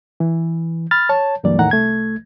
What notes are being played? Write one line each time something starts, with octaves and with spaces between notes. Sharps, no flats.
E3
B5 F6 A6
C#5 A5
C#2 G2 E3 F#3 A#3 D5
E2 A2 D#3 F#5 A#5
C2 A3 G#6